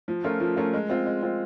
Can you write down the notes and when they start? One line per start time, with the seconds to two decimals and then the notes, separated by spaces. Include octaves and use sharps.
0.08 F3
0.24 A3 C#4 F4 A#4
0.40 F3
0.56 A3 C#4 F4 A#4
0.73 G#3
0.89 C4 F4
1.06 G#3
1.22 C4 F4